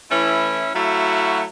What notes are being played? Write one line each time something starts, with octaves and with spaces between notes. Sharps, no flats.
E3 A3 C#4 E4
F#3 A3 E4 F#4 F5